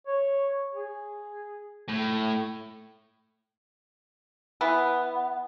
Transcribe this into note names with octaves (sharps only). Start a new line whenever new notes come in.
C#5
G#4
A2
E3 B3